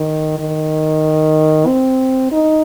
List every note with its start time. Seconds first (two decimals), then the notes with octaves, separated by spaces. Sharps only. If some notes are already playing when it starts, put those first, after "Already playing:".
Already playing: D#3
0.39 D#3
1.67 C4
2.32 D#4